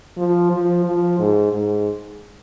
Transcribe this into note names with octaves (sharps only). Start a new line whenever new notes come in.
F3
F3
F3
G#2
G#2